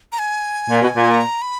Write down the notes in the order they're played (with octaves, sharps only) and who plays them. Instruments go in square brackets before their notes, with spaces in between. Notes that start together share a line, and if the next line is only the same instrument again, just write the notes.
[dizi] A#5
G#5
[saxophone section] A#2
B2
A#2
[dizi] A#5
B5